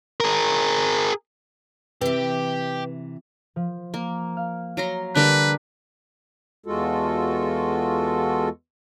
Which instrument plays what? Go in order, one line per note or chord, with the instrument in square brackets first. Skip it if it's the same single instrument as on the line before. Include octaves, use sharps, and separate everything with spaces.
[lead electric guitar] G#4 A#4
[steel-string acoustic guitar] C3 E3 [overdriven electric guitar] G4 [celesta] B4
[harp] F3
[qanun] A#3
[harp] F5
[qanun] F#3 A#5 C6 [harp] F6
[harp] D3 G3 A#3 [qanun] D4 G4 A#4 [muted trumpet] B4
[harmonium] E2 G#3 F4 F#4 A4